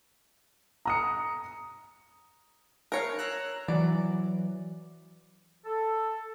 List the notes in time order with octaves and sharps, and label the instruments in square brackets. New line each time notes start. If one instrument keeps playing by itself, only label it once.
[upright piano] A#5 D#6 C#7
[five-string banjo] A#4 C#5 [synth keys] F5 C#7 D7
[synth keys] A#5 E6 F#6
[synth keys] E3 F#3 [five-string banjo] D5
[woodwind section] A4